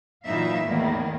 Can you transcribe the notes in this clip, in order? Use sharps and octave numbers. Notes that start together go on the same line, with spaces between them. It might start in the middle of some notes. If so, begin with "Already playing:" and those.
A#2 E3 F#3 D#4 E5 F5
E2 A2 D#3 A#3